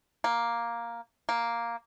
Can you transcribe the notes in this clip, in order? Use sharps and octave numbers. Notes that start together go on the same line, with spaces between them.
A#3
A#3